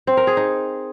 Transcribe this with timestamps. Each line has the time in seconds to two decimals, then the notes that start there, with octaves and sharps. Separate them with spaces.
0.07 C4
0.17 A#4
0.27 G#4
0.37 D#4